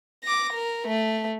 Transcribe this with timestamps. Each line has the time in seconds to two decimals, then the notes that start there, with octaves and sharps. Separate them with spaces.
0.24 D6 A#6
0.53 A#4
0.88 A3